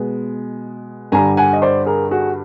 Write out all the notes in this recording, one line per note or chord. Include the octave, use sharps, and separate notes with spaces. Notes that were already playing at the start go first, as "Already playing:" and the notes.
Already playing: B2 G#3 B3
G2 D3 G3 G#5 A#5
F#5 G#5
D#5
C5 D5
G#4 A#4
F#4 G#4